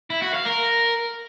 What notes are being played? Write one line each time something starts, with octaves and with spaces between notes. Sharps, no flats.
E4
F#4
F5
A#4